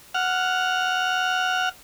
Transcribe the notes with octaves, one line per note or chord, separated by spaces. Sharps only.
F#5 F6